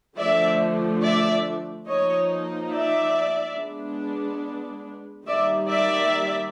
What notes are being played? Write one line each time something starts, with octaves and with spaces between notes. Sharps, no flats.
D3 F3 A3 D4 D5 E5
D5 E5
F3 A#3 D#4 C#5 D#5
D5 E5
G#3 B3 D4
D#3 G3 A#3 D5 E5
D5 E5